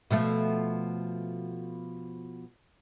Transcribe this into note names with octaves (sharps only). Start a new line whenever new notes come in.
B2 F3 A3